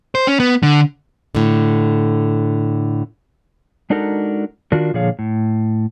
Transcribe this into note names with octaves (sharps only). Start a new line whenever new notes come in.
C5
C#4
B3
D3
A2 D3
G#3 D4 D#4 F#4 A4 A#4
D#3 D4 F4 F#4 A#4
A#2 D3 F3 G#4 C#5 F5
A2